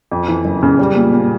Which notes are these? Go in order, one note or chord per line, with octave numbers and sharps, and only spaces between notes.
F2
E3
F#1
C#3
G3
A#2
A#2